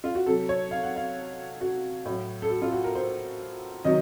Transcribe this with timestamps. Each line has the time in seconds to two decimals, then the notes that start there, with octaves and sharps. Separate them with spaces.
0.04 F4
0.15 F#4
0.26 C3 F#3 A4
0.49 C#5
0.71 F5
0.83 F#5
0.96 F5
1.61 F#4
2.06 A2 F#3
2.42 A4
2.50 F#4
2.62 F4
2.73 F#4
2.84 A#4
2.95 C5
3.85 C3 D#3 F#3 D#5